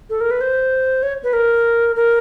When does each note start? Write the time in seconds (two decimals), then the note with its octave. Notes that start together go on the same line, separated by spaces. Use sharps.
0.10 A4
0.21 A#4
0.31 B4
0.41 C5
1.03 C#5
1.24 B4
1.33 A#4
1.96 A#4